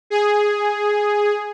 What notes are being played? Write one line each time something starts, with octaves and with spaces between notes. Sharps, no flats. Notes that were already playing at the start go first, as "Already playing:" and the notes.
G#4